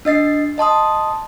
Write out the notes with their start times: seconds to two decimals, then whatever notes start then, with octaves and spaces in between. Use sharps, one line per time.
0.05 D4 D#5 A6 C7
0.58 D#5 A5 C6 D#6